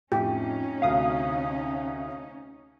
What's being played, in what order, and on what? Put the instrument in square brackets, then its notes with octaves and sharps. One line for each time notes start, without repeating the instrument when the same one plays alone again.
[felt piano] F2 A2 [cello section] C#4 D#4 [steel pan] G4
[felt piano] D2 C3 [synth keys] F5 D#6